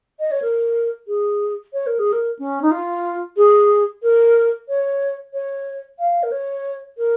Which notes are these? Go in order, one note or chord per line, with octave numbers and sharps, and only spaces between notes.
D#5
C#5
A#4
G#4
C#5
A#4
G#4
A#4
C#4
D#4
F4
G#4
A#4
C#5
C#5
F5
A#4
C#5
A#4